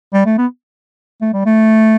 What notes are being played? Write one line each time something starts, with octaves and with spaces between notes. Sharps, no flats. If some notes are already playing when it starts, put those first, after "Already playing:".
G3
A3
B3
A3
G3
A3